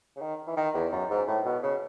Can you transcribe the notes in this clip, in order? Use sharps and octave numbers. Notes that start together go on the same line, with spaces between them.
C#3
D#3
E3
D#3
E2
F#2
G#2
A2
B2
C#3